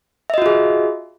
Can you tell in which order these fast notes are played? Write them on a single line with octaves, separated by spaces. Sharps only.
E5 D#5 F#4 F4 G#4